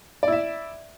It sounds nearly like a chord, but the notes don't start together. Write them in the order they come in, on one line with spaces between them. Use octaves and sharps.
D5 E4 E5